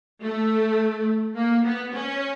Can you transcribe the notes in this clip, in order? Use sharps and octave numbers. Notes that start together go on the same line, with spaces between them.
A3
A#3
B3
C#4